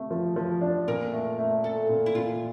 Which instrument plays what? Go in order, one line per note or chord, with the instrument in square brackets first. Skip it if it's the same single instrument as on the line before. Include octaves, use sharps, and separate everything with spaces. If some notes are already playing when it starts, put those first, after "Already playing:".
Already playing: [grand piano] C3 A3
F3
F3
D4
[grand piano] A#2 [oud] A#4
[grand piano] A3
A3
[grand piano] A3 [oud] A4
[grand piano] A#2
[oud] E4
[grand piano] A#2 [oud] F4